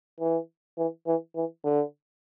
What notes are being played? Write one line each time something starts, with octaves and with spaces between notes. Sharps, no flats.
E3
E3
E3
E3
D3